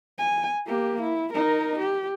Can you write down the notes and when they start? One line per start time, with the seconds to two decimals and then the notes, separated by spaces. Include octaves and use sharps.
0.18 G#5
0.66 A#3 G4
1.02 E4
1.33 D#4 A#4
1.78 G4